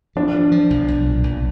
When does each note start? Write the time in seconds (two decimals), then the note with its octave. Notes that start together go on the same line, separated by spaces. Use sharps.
0.16 F3 D4
0.34 F3
0.52 F3
0.70 B1
0.88 B1
1.06 A#2
1.23 B1